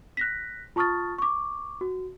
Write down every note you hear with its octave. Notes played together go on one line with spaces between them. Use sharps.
F#6 A#6 B6
F4 A5 C#6 D#6 F6 A6
C#6 D6
F#4